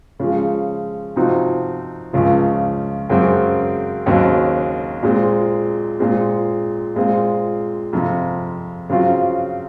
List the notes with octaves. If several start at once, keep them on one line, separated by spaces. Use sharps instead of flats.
C#3 F3 G#3
C3 F3 C4 D#4 F#4
C#2 C#3 F3
F#2 C#3 G#3 C4
D#2 C#3 F#3 C4
A#2 G#3 C4
A#2 G#3 C4
A#2 G#3 C4 F4
F2 C3 F3
C#3 F#3 C4 F4